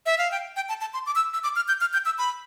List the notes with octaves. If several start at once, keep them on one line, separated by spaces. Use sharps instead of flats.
E5
F5
G5
G5
A5
A5
C6
D6
E6
E6
D6
F6
G6
F6
G6
E6
B5